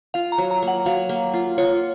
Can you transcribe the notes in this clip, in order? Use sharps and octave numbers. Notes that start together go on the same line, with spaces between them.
F4 F5
A#5
F#3
A#5
A#3
F#5
F#3 F5
A#3
F4
F4 C#5